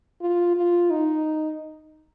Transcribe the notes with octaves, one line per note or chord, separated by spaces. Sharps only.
F4
F4
D#4